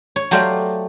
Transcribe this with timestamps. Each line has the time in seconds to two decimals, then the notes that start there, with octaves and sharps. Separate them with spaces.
0.16 C#5
0.31 F#3 A3 G4 C5 D5 F5